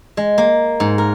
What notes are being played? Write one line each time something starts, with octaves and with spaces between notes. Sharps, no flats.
G#3
A#3
G#2
A#4